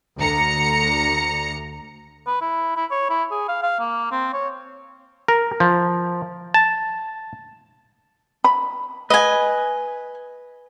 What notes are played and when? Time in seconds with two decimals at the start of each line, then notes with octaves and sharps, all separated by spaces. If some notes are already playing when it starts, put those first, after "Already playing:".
0.18 D2 A#5 C#7
2.27 B4
2.41 E4
2.76 E4
2.91 C#5
3.10 E4
3.31 G#4
3.49 F5
3.63 F5
3.79 A#3
4.11 C4
4.33 C#5
5.28 A#4
5.60 F3
6.54 A5
8.44 B5
9.10 B4 D#5 G#5